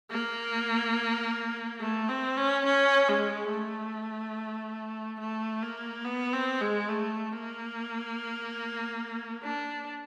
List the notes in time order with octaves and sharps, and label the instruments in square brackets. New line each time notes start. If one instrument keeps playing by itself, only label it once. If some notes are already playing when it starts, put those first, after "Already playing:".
[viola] A#3
A3
C4
C#4
C#4
G#3
A3
A3
A#3
B3
C4
G#3
A3
A#3
D4